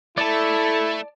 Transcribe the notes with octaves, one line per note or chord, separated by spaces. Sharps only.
A3 E4 A4 D5 A5